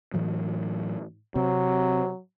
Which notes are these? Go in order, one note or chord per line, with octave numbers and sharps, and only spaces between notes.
A2 E3 F#3
C3 F#3 C4